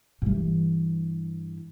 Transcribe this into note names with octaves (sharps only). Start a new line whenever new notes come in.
G2 E3